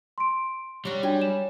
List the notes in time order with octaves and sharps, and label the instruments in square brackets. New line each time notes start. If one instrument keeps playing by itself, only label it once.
[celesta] C6 D7
[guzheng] F#3 F#4 [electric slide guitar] G3
[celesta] D4 F#4 G5 [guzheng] G#5
[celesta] E7